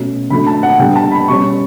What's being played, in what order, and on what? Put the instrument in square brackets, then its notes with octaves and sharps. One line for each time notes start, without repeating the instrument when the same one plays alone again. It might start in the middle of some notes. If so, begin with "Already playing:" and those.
Already playing: [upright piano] B2 A3 C#4
D3 F#3 A3 B5
A5
F#5
D3 G3 B3 G5
A5
B5
B2 G3 C#4 C#6